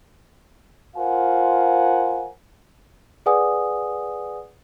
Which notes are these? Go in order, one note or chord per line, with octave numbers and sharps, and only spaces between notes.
F4 A#4 C5 F5 F#5 G#5
G#4 B4 D5 F#5 G#5 D#6